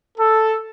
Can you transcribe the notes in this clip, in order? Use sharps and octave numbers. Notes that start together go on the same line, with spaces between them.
A4